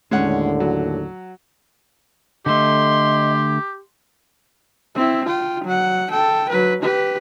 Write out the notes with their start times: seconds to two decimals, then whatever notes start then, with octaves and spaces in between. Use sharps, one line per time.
0.11 D#2 A2 D3 G#3 C#4 F#5
0.60 F#3
2.46 D3 A3 G4 D#5 C6
4.95 C4 E4
5.26 F4 G5
5.64 F#3 F#5
6.10 A4 G5
6.49 F#3 B4
6.82 G4 B4